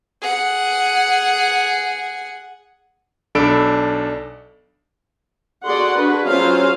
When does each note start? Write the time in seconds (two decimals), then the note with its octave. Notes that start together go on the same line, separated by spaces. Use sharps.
0.22 G#4 F#5
3.35 B1 D4 A4 B5 D7
5.65 F#4 G#4 A4 D5 F#5 C6
5.95 D4 F#4 G#4 B4
6.28 F#3 C#4 F4 G#4 C5 F5